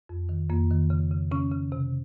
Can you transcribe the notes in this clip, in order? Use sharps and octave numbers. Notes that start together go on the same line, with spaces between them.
F2
D#3
F2 A#3
D#3
C#3
C#3
C#3 C#4
C#3
C3